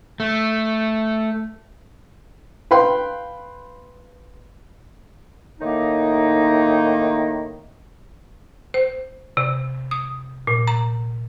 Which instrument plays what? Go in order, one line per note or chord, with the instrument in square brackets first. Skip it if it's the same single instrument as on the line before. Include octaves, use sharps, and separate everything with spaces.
[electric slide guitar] A3
[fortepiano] B4 F5 G5 C6
[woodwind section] A2 D#3 A#3 D#4
[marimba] C5
C3
D#6
A#2
A#5